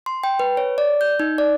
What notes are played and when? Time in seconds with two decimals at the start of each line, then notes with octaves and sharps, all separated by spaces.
0.06 C6
0.24 G5
0.40 B4
0.57 C#5
0.78 D5
1.01 G6
1.20 D#4
1.38 D5